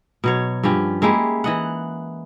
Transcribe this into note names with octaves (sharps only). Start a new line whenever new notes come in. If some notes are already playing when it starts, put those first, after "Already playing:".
B2 F#3 C#5
G2 F3 C#4 G4
G#3 A#3 E4 G4
E3 D#5 F#5